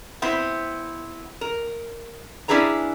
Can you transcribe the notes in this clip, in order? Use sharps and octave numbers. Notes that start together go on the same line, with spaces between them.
B3 C4 E4 C5
A#4
C#4 D4 E4 G#4 B4 A#5